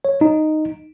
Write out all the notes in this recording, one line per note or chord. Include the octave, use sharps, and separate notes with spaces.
C#5
D#4